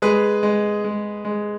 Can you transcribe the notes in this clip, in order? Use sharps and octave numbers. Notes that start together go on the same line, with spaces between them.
G#3 G#4 B4
G#3
G#3
G#3